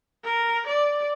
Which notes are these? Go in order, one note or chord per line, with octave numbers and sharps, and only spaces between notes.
A#4
D5